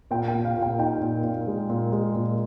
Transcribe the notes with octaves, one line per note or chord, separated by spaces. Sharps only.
A#2 G5
G5
A#2
F5
A#2
G5
D#4 G5
A#2
A#2
G#3
A#2
G#3
A#2